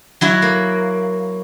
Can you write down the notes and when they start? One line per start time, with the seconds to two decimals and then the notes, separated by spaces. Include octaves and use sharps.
0.21 F#3 E4 F#4
0.42 A#3